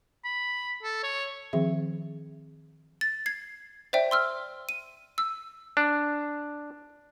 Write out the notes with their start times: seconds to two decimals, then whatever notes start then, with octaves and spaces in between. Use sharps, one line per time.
0.25 B5
0.83 A4
1.03 C#5
1.53 D#3 F3 C4 G#4 E5
3.01 A6
3.26 G#6 C7
3.93 C5 D5 E5 G5
4.11 C6 E6 F6
4.69 D#7
5.18 E6
5.77 D4